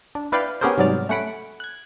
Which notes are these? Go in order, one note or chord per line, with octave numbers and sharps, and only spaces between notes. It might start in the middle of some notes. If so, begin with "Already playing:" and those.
D4
E4 B4 D5 F5 G5
B3 C#4 G4 G#4 A#4 C5
G#2 C3 F#3 G3 D5 F6
A3 C#4 F#5 B5 D7
F#6 G#6